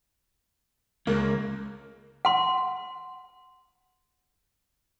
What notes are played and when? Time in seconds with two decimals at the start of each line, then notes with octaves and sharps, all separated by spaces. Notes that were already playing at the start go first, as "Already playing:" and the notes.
1.07 C#2 A#3
2.25 F#5 C6